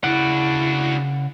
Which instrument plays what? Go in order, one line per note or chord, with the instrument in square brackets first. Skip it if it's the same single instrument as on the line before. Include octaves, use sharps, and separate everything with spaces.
[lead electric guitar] C#3 F#5 [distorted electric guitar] D4 F#4 [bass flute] E4